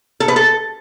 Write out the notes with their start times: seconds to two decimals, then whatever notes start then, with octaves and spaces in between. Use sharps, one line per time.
0.20 A4
0.28 B4
0.36 A4